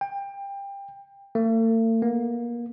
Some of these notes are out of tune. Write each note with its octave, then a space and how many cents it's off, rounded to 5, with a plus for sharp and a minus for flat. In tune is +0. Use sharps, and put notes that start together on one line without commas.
G5 +25
A3 +45
A#3 +30